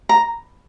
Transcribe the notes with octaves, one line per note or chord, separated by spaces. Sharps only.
A#5